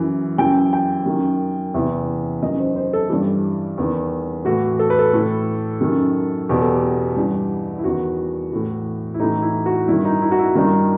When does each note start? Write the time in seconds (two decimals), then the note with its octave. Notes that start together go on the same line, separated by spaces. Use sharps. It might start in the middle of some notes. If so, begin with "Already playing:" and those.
Already playing: F#2 E3
0.38 F#2 E3 G5
0.73 G5
1.06 F#2 D#3
1.74 E2 C3 E3 E5
2.42 F#2 D#3 D#5
2.60 C5
2.76 C5
2.93 A4
3.10 G2 E3 G4
3.78 E2 D#3
4.45 A2 E3 F#4
4.79 A4
4.90 B4
4.99 A4
5.13 A2 E3
5.81 F#2 D#3
6.49 E2 B2 G4
6.61 A4
6.74 G4
7.17 G2 E3 G4
7.79 E4
7.84 E2 D#3 F#4
8.52 A2 E3
9.14 E4
9.20 A2 E3 D#4
9.42 E4
9.66 F#4
9.88 G2 D#3 E4
10.05 D#4
10.22 E4
10.32 F#4
10.39 E4
10.55 G2 D#3 D#4